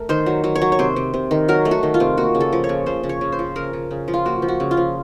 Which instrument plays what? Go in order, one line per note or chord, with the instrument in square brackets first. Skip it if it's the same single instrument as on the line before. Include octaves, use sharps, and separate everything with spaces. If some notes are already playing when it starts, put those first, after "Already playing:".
Already playing: [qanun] A3 A#4
D#3 C5
F#3
F#3
C#5
F#3
C#5
C3 C5
C3
C3
D#3
F#3 A#4
A3
F#4
D#3
F4
C3
A#3 F#4
C#3
A4
F3
C#5
C#3
C#3 C5
C#3
C#5
C#3
C5
F3
C#3 A#4
C#3
C#3
F3
F4
A#3 F#4
F3
F#4
C#3
F4
F3